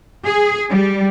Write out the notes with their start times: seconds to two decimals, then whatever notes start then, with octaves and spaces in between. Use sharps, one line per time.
0.25 G#4
0.70 G3